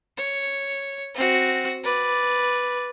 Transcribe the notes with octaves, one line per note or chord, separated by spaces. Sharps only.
C#5
C4 F#4
B4 D5